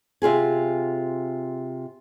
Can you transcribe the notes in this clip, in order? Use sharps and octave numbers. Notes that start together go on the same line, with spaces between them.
C3 F4 G#4 G#5